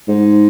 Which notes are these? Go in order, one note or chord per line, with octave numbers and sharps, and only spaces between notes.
G#2